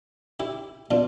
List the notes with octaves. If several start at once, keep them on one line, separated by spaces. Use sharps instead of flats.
E4 G4
B2 D4 F4